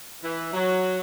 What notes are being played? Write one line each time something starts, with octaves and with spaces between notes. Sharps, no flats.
E3
F#3